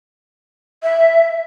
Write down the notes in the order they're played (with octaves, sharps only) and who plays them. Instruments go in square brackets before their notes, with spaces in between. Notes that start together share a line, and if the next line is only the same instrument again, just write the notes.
[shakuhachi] E5